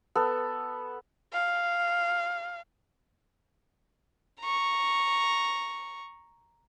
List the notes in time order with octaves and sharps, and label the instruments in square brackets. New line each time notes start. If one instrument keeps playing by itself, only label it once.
[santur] B3 A4
[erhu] F5
[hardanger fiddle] A#5 C#6